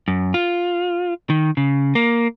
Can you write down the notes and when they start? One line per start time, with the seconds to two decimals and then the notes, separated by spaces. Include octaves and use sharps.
0.08 F#2
0.34 F4
1.30 D#3
1.57 C#3
1.95 A#3